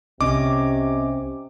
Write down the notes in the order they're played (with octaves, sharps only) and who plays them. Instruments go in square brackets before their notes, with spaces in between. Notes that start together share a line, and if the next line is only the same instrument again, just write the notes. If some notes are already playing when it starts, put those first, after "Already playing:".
[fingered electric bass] C2 [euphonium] C3 [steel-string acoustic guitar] C#4 D#5 [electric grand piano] D6